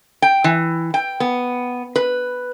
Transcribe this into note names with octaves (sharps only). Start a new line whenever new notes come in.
G5
E3
G5
B3
B4